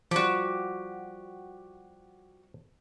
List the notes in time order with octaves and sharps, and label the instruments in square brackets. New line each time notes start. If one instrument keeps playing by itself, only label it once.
[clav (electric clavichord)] F3 G3 [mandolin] F#4 G4